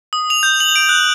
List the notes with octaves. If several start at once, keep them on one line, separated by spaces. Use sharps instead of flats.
D#6
F7
G6
F#7
D7
F#6